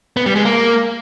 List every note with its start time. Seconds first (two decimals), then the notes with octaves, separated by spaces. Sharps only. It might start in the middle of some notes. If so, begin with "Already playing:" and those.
0.17 B3
0.26 G3
0.36 G#3
0.45 A#3